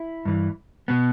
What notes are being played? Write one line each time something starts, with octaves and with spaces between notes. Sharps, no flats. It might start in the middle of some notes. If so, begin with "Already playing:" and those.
Already playing: E4
G2 E3
B2 B3